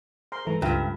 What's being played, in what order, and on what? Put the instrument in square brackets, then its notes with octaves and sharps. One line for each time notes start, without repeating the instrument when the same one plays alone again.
[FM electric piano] G#4 A#4 C5 [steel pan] C6
[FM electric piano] G#2 E3 A3 [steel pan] A4 A#5
[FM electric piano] C#2 [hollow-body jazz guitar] G2 [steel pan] F4 E5 A#5